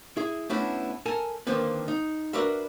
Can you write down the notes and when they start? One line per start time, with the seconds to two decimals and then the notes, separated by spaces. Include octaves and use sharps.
0.17 E4 G#4
0.50 A3 B3 C#4 D4 E4 F#4
1.06 A4 A#4 G#5 A5
1.47 D3 D#3 F3 A#3 C4 B4
1.88 D#4
2.33 D4 F#4 A#4 B4 E5